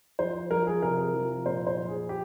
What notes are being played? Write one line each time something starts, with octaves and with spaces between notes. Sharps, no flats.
F3 C5
F3 A#4
G#4
C3 A#4
F3
A#2 C5
C5
F3
G#4
G4